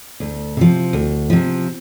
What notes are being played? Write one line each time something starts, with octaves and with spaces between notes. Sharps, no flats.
D2
C3 F3
D2
C3 F3